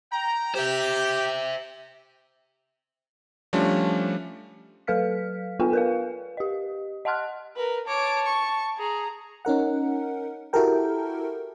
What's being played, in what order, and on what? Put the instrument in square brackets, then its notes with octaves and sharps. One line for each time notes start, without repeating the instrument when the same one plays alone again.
[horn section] G5 A#5
[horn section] G4 [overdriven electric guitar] C5 E5
[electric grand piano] F3 G3 A3 C#4 D4
[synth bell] F#3 A4 B4 F5 F6 B6
B3 F4 A4 B4 G5 G#5
A#4 B4 F5
G4 D#5
D#5 F#5 A5 C6 F6 F#6
[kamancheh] A#4 B4
[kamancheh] C#5 D6 [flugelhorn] A5
[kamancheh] C#6
G#4 A#5
[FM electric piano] C#4 D#4 A#4 F#5
E4 F#4 G4 A4 A#4 G5